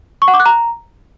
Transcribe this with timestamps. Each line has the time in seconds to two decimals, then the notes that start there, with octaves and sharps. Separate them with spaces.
0.22 C#6
0.28 F#5
0.34 D6
0.40 F#6
0.46 A#5